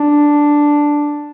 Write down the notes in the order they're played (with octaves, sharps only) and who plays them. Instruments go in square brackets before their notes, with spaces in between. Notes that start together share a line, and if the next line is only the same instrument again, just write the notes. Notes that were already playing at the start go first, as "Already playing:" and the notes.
Already playing: [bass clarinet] D4